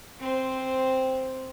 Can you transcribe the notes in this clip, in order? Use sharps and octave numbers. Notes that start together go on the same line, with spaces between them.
C4 C5